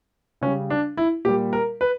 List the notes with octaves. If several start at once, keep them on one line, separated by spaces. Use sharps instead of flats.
C#3 G3 C#4
D4
E4
A#2 G3 G4
A#4
B4